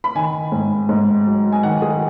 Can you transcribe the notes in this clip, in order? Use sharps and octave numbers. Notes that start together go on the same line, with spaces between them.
B5
D#3 G#5
G#2
G#2
F#3
G#5
D#3 F#5
G#4